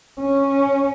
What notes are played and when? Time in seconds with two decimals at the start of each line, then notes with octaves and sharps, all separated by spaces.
0.20 C#4